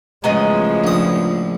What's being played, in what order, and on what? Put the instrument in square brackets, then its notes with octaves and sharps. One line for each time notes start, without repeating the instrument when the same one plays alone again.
[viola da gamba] A2 C#3 F3 [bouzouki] F#3 B3 D#5 [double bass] G#3
[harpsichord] A#1 D#6